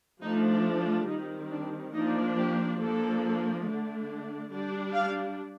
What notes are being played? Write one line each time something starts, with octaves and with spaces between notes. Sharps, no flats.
F3 A3 D4 D#4
F4
F4
D#3 G3 C4 D#4
D4
F3 A#3 D4 D#4
G4
F3 A#3 D4 A4
D3 A3 D4
G3 D4
F5